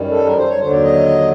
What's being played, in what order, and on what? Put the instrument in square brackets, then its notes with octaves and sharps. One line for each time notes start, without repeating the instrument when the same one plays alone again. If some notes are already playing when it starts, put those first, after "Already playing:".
Already playing: [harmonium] F#2 D#3 G3
A4
A#4
C5
C#5
D#2 D3 F#3 C5
D5
D#5